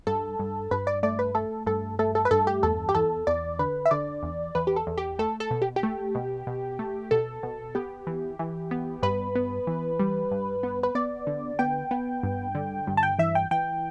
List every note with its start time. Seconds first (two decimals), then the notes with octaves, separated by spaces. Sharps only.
0.07 G2 A4
0.39 G2
0.71 G2 B4
0.87 D5
1.03 A3 D5
1.19 B4
1.35 A3 A4
1.66 G2 A4
1.99 A3 A4
2.15 A4
2.25 B4
2.31 G2 A4
2.47 G4
2.63 E2 A4
2.89 G4
2.95 E2 A4
3.27 E2 D5
3.59 D3 B4
3.86 E5
3.91 D3 D5
4.23 E2
4.55 E2 B4
4.67 G4
4.76 A4
4.87 E2
4.97 G4
5.19 A3 A4
5.40 A4
5.51 B2
5.62 G4
5.76 G4
5.83 A3
6.15 B2
6.47 B2
6.79 A3
7.11 B2 A4
7.43 B2
7.75 B3 G4
8.07 E3
8.39 E3
8.71 B3
9.03 G2 B4
9.35 B3
9.67 E3
9.99 G3
10.31 G2
10.63 B3
10.83 B4
10.95 B3 D5
11.27 D3
11.59 B3 G5
11.91 B3
12.23 G2
12.55 D3
12.87 G2
12.97 A5
13.03 G5
13.19 E3 E5
13.35 G5
13.51 E3 G5